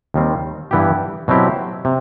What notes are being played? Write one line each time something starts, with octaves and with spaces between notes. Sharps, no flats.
D#2 D#3 G3 C4
G2 E3 B3 E4 G4
B2 F#3 C4 E4 G4
C3